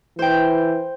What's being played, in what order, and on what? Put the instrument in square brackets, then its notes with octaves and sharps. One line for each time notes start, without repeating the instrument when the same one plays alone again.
[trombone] E3 [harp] C5 G5